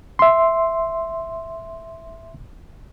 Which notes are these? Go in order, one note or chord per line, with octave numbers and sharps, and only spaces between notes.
E5 C6